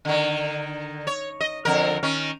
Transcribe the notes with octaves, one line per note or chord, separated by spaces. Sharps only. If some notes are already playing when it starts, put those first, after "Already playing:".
D3 D#3
C#5
D#5
F2 D3 A#4
D#3 C#4